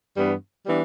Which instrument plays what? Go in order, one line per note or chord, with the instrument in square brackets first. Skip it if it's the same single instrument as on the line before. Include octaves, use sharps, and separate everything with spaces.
[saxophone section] G2 E3 G3 B3 D4
E3 G3 B3 D4